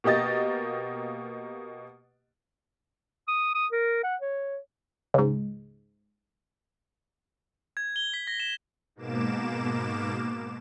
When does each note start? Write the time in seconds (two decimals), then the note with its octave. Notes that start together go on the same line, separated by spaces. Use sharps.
0.04 B2 A#3 G4 D#5 A6
3.28 D#6
3.55 D#6
3.72 A#4
4.03 F#5
4.21 C#5
5.14 C#2 G#2
7.77 G#6
7.96 G7
8.14 B6
8.27 A#6
8.40 E7
8.96 G#2 B2 A#3 D6 E7